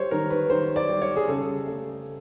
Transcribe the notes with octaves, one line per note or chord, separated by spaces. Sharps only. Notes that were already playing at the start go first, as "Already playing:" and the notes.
Already playing: G3 C5 C#5
D#3 A#4
B4
D#3 C5
D5
G3
C#5
G#4
C#3 A4
A3